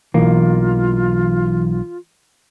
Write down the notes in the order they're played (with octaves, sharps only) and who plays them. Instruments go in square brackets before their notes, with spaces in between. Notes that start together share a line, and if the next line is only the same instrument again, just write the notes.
[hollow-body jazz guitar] B1 A#3 [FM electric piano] E3 [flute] F4